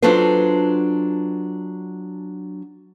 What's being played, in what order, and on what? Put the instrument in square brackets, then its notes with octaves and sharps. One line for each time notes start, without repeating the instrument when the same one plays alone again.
[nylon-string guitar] F#3 D4 F4 A4 B4 C5